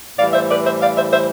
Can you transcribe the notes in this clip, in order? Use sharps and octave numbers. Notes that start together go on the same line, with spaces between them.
A2 E3 G3 D5 F5
C5 E5
B4 D5
C5 E5
D5 F5
C5 E5
C5 E5